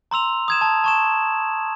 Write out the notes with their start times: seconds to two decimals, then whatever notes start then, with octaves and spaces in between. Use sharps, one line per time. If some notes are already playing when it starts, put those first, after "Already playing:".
0.11 A#5 C6 E6 F7
0.48 D#6 G#6 E7
0.61 A5
0.84 A5 C#6 E7